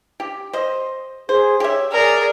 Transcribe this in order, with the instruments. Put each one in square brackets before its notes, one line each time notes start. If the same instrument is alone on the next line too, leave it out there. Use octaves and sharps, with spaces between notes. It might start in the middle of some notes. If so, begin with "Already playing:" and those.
[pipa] G4
C5 D#5
[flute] G#4 [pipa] C5
[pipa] G4 E5 [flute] C#5
[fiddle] G#4 A#4 [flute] D5